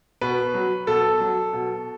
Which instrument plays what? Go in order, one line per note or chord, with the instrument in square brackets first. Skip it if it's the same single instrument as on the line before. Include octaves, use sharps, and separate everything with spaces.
[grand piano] B2 B4
F#3
B2 A4
F#3
B2